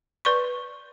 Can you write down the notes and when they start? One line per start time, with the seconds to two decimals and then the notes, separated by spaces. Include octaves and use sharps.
0.25 B4 D5 C6 C#6